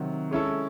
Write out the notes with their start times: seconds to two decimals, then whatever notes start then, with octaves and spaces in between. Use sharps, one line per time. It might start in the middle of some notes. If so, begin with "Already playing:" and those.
Already playing: C3 D#3 F#3
0.31 G#3 C#4 E4 A4